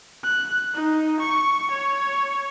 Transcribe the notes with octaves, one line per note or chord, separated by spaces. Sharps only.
F#6
D#4
C#6
C#5